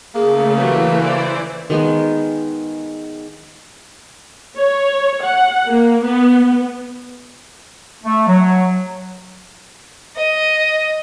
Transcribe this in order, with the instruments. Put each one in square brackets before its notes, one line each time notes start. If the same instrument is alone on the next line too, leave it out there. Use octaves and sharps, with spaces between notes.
[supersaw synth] C#3 A3 [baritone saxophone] A#3 [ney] G#4
[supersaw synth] E3 [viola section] F#3 A3 G4 [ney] B4
[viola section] C5 D5
[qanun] D#3 G#3 B3
[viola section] C#5
F#5
A#3
B3
[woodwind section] A3
F#3
[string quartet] D#5